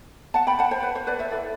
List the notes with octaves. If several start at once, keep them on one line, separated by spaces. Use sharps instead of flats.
F#5 A5
G5 B5
F#5 A5
C5
B4
C5
B4 D5
C5 E5
E4 A4 B4 D5